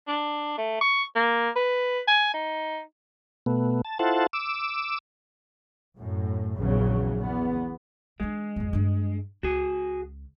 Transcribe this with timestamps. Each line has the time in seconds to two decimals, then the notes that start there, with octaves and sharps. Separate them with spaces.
0.08 D4
0.58 A3
0.81 C#6
1.16 A#3
1.56 B4
2.08 G#5
2.34 D#4
3.46 B2 A3 B3
3.85 A5
3.99 E4 F4 A4 C5 F#5 A5
4.33 D6 E6
5.97 F#2 A2
6.59 A#1 E2 C#3 F#3
7.18 E2 B3
8.20 E3 G#3 D4
8.56 G#1 F2
8.73 G2 D4
9.43 C#2 F#4 G#4